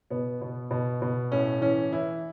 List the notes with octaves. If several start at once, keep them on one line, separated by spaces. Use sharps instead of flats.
B2 B3
B2
B2
B2
A2 C#4
E3 C#4
E3 E4